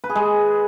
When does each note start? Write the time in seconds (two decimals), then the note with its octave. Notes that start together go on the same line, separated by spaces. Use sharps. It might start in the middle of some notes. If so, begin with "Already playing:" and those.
0.04 B4
0.10 G#4
0.15 G#3